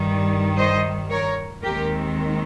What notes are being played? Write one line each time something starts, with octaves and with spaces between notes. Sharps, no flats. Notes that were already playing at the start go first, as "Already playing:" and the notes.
Already playing: G2 D#3 G3
C5 D#5
A#4 C#5
D#2 D#3 G#3 C4 G4 A#4